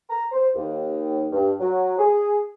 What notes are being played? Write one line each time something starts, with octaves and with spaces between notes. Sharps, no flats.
A#5
C5
D#2
G2
F#3
G#4